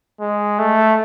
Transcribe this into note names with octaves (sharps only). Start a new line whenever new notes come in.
G#3
A3